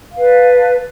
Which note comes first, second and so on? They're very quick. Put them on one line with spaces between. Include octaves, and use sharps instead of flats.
F5 B4 D5 A5